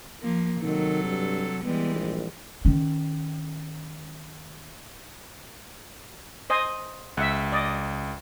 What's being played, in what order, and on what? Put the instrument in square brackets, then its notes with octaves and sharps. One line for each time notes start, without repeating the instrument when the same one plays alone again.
[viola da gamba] F3 A#3
[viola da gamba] C3 F#3 A4 [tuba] D#3
[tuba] G2
[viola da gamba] E3 G3 G#3 [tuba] B3
[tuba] A#1
[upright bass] D#3 C#4
[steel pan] C5 D#5 G#5
[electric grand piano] C#2 [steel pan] E5 F#5
[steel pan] D5 D#5